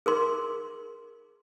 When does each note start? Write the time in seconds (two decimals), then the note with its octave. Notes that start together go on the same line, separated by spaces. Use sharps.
0.06 G#4 A#4 C6